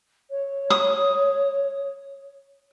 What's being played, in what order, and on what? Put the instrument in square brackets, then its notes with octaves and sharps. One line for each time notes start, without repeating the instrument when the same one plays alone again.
[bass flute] C#5
[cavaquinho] D#6